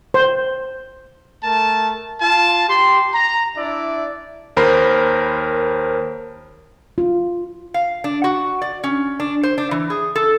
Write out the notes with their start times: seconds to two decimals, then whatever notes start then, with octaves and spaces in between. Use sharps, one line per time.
0.14 C5
1.44 A3 A#4 A5
2.21 F4 A5
2.69 G4 C6
3.14 A#5
3.57 D4 E4 D5 E5
4.57 D#2 A#4 C5 B5 C7
6.98 F4
7.74 F5
8.04 D4
8.24 F#4
8.62 D5
8.84 C#4
9.20 D4
9.43 C5
9.58 D4
9.71 E3
9.90 G#4
10.15 A4